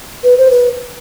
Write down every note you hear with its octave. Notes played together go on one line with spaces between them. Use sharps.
B4
C5
B4